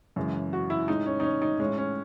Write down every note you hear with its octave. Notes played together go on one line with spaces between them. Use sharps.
F#2 C#3 E3 G#3
F#4
E4
A2 G#3 D#4
C#4
D#4
C#4
D#4
A2 G#3 C#4
C#4